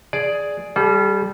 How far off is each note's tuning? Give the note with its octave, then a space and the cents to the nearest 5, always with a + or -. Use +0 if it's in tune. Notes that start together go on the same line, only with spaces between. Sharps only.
G#4 +0 D5 +0
G3 +0 A4 -45